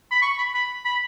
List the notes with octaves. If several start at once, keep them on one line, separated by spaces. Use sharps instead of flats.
B5
C#6
B5
B5
B5